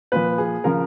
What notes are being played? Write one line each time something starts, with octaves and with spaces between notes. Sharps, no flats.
A#2 F3 B4
G#4
C#3 F3 A#4